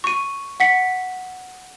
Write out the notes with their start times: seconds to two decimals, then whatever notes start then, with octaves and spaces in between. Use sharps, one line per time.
0.04 C#6 D#7
0.60 F#5 B6 C#7